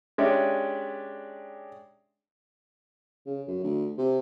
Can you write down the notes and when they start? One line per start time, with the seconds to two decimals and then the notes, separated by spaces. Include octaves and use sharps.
0.18 G#3 C#4 D4 G4 D5 E5
3.26 C#3
3.47 F#2
3.63 D2
3.98 C3